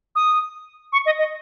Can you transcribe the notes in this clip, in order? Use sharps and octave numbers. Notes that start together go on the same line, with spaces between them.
D#6
C#6
D#5
D#5